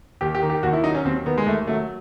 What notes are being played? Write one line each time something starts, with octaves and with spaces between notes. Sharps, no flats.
D#2 G4
G4
D#3
G4
D#2 F#4
E4
F#3 D#4
C#4
D#2 C4
D#3 B3
G#3
D#2 A3
F#3 A3